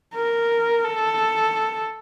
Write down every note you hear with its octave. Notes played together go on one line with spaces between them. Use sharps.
A#4
A4